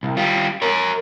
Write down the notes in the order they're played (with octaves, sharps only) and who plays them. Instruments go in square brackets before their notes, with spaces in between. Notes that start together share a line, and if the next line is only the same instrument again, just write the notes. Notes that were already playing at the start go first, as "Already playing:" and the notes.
[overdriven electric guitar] C2
G3 F4
A#4 C#5